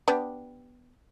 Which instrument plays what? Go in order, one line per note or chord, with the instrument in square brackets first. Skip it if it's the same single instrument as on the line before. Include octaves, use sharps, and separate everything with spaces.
[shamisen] B3 D4 G4